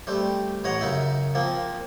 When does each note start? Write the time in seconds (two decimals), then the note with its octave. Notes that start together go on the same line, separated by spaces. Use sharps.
0.07 G3 A3 C4
0.64 A1 C#5 D#5 F#5 A#5
0.81 F#2 C#3 D#4 E5
1.35 F3 A#3 C4